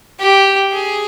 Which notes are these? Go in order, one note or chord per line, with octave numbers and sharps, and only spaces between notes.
G4
G#4